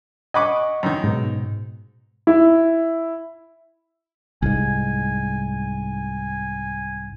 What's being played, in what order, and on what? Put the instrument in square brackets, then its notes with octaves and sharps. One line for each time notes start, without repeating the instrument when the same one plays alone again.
[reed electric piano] D#5 F#5 C#6 [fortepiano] G#5 B5 D6
[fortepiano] F#2 D#3
[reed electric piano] G#2 B2
[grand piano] E4
[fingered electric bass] C2 G#2 [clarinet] G#5